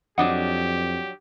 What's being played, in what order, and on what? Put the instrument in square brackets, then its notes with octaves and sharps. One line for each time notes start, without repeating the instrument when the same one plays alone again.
[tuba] F2 [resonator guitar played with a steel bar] F#3 D4 D#5 [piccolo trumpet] G4 [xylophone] F#5